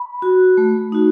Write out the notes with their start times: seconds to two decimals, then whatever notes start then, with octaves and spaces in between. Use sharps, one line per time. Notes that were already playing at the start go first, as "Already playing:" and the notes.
Already playing: B5
0.22 F#4
0.57 A3
0.92 D#4 F#4